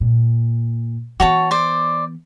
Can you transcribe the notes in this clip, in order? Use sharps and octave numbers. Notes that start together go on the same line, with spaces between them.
A#2
E3 B3 F#4 C#5 A5
C5 D5